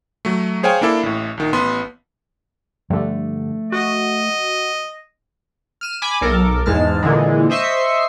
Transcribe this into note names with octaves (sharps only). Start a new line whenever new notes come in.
F#3 A3
G#4 C5 C#5 F5 G5 G#5
A#3 D4 E4 A4
A1 A2
A#1 D#3
A1 B3 C6
G2 D3 F3 A3
F#4 D#5
F6 D#7 E7
G#5 B5 D6
B1 A4 A#4 D6
E2 G#2 G#3 A5 F6
A#2 D3 E3 G#3
C5 D#5 E5 C#6 C7